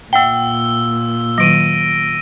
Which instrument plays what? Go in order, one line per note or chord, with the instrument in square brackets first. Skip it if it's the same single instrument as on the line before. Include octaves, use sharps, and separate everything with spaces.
[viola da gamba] A#2 [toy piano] E5 F#5 G5 [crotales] E6 G7
[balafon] D#3 F#3 [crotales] A#6 D7 D#7